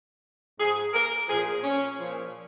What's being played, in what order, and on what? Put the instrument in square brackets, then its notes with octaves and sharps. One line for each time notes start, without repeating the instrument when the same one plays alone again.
[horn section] G#2 F3 G#4
A#4
A#2 F3 G#4
C#4
A#2 F3